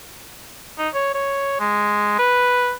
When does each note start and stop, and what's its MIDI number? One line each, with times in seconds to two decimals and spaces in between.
0.78 0.89 63
0.94 1.13 73
1.15 1.55 73
1.60 2.16 56
2.19 2.72 71